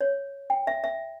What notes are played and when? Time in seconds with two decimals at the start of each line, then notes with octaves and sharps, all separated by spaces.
0.01 C#5
0.50 G5
0.67 E5
0.84 E5